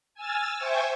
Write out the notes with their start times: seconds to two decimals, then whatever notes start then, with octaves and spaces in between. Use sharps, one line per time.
0.14 G#5 E6 F6 A6
0.58 C5 E5 G5 G#5 C#6